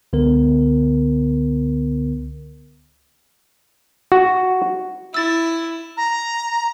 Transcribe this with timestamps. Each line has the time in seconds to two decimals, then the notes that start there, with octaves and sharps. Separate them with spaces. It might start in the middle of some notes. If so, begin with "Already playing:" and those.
0.13 C#2 D3 B3 A#4
4.12 F#4
5.14 E4 E6 A6
5.97 A#5